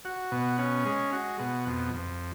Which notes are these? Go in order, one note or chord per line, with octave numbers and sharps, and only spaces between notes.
F#4
B2
C#4
G#3
F#4
B2
F2
F2